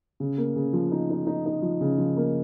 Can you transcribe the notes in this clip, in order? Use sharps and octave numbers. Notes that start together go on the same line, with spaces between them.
C#3
A#3
C#3
F3
D#4
D#4
D#4
D#4
F3
C#3
F3
A#3